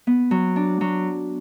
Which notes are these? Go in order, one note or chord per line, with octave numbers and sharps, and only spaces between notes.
B3
F#3
D4
F#3